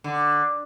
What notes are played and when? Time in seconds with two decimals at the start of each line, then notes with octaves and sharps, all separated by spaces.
0.04 D3